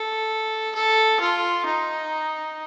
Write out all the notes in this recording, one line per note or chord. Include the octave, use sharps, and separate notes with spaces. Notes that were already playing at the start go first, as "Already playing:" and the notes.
Already playing: A4
A4
F4
D#4